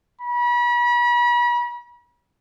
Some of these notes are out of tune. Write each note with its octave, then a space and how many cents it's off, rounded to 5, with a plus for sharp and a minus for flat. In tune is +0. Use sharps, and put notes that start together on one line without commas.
B5 -40